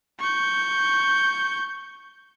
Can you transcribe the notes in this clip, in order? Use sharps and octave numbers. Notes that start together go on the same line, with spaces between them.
C#6 G6